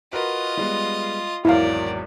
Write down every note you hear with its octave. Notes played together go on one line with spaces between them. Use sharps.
F4 F#4 A#4 B4 D#5
G3 G#3 B3
G#1 E2 F#3 E4 A#4 D5 F5